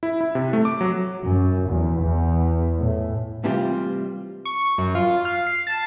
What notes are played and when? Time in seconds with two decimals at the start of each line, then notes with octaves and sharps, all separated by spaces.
0.03 E4
0.21 E4
0.35 C3
0.53 A3
0.65 D6
0.81 F#3
1.23 F#2
1.70 E2
2.00 E2
2.78 A2
3.44 A2 C3 E3 G3 C4 F4
4.45 C#6
4.78 F#2
4.95 F4
5.25 F5
5.47 C7
5.67 A5